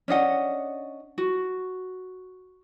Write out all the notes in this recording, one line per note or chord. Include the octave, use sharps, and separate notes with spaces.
C#4 D4 D#5 F#5
F#4